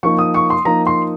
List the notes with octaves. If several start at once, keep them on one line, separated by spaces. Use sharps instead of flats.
F3 A#3 D#4 C#6
D#6
C#6
C6
F3 A#3 D#4 A#5
C6